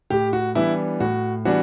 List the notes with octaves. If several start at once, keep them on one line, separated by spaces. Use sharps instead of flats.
A2 G4
F#4
E3 G3 B3 D4 E4
A2 F#4
E3 G3 B3 D4 F#4